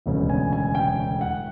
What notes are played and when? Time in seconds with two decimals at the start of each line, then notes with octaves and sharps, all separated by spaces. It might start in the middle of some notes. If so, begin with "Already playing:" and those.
0.06 E1 D2 C#3 F#3 B3
0.29 G#5
0.53 G#5
0.75 G5
1.21 F#5